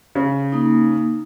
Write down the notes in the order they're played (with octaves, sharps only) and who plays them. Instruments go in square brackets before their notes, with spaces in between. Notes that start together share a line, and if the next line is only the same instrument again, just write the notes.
[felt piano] C#3
[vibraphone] A#3 D#4